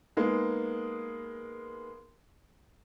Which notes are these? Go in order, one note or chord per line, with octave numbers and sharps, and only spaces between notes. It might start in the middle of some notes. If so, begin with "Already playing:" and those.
G#3 A#3 B3 D#4 G#4